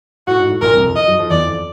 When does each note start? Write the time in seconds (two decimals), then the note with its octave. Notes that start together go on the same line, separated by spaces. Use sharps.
0.27 A2 F#4
0.39 G#2
0.50 A2
0.61 A#1 A#2 A#4
0.73 C2 C3
0.84 F2 F3
0.96 D#5
1.08 F#2 F#3
1.19 F2 F3
1.30 E2 E3 D5
1.47 F2 F3